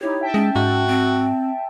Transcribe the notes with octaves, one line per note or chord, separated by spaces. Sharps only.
D#4 E4 G4 C#5
E5 G5 A5
G#3 C#4
G#2 F#4
C4